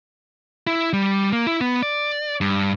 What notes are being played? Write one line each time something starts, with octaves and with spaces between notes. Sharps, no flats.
E4
G3
A#3
E4
B3
D5
G2